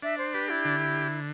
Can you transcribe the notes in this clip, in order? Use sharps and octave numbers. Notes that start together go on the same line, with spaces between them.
D4 E5
C5
G4 B4
E4
D3